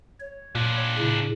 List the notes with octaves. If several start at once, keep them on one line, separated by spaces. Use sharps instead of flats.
C#5
A#2 D4 F4
A2 C#3